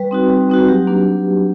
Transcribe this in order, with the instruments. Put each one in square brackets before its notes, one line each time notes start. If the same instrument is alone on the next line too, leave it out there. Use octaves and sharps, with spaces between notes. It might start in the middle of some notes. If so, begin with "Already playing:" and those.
Already playing: [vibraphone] G3 B4
C4 D#4 F#4
G3
C4 D#4 F#4
F#3 G4
A#3 D4